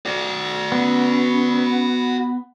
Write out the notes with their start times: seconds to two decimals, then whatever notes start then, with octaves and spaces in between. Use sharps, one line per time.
0.06 F#4 D5
0.72 B3 C#4